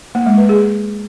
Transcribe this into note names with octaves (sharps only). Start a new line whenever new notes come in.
A#3
G#3
B4
G#4